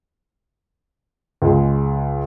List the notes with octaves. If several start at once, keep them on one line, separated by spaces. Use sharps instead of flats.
C#2 G#3